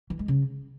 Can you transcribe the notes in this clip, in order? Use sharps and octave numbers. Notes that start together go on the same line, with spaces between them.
E3
G#3
C#3